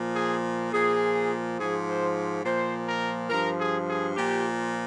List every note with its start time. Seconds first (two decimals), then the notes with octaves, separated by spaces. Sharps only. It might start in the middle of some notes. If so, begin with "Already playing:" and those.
Already playing: A#2 F3
0.16 G#4
0.73 A#2 F3 G#4
1.58 G#2 F3 G#4
1.87 C5
2.44 A#2 F3 C5
2.87 A#4
3.30 G2 F3 A#4
3.59 G#4
3.88 G#4
4.16 A#2 F3 G4